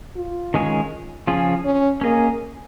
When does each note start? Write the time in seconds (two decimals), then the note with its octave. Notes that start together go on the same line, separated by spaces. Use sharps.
0.16 F4
0.54 D#3 G#3 C#4 G#4 C#5
1.27 C#3 F3 C#4 F4 G#4
1.65 C#4
2.01 A#3 C#4 G#4 D#5